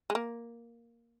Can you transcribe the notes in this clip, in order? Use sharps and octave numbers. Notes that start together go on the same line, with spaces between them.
G#3
A#3